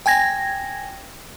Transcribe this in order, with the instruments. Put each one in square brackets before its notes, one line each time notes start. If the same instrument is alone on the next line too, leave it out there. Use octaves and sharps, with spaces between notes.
[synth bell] G5 G#5 G#6 A#6